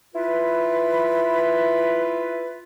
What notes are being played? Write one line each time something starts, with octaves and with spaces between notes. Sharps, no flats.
E4 F4 B4